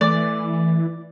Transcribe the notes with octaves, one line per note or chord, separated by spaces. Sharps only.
E3 A3 D5